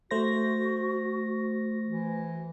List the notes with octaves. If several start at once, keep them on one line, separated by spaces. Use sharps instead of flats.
A3 F#4 C5 A#6
E3